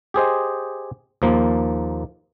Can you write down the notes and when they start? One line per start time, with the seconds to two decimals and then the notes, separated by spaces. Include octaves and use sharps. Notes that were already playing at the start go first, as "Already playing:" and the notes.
0.14 G4 G#4 C5 D#5
1.22 D#2 F3 A#3